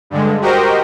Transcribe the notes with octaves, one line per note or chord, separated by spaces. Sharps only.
G2 D3 G#3
F#4 G4 A#4 C5 D#5 G5